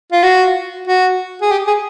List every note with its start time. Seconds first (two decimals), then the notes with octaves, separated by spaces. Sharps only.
0.12 F4
0.23 F#4
0.88 F#4
1.42 G#4
1.52 G4
1.67 G#4